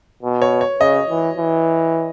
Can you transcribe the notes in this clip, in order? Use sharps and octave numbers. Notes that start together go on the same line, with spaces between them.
B2
C#5
C#5
C#3 D#5
E3
E3